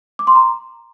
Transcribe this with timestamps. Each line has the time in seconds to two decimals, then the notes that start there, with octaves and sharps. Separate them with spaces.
0.19 D6
0.27 C6
0.35 A#5